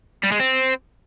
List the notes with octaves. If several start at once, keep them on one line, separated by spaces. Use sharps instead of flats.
G3
G#3
C4